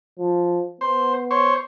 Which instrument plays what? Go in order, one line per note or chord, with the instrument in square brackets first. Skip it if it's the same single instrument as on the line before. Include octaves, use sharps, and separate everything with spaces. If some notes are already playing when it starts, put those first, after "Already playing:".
[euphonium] F3
[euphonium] B3 [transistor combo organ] C5
[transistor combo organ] C5 C#5